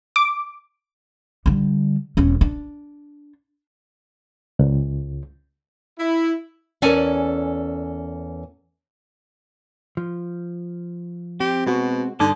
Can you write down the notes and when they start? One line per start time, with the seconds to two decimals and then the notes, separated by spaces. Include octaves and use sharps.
0.16 D6
1.46 D3 G3
2.17 E1 C#4
2.41 D4
4.59 C#2
5.99 E4
6.82 E2 C#4 A4 A#4 D5 G#5
9.97 F3
11.40 C4 G4
11.67 B2 G#3 F#4
12.20 G2 D3 D#4 C6 D6 D#6